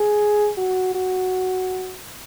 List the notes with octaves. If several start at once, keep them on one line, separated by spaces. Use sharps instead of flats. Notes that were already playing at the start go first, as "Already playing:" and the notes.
Already playing: G#4
F#4
F#4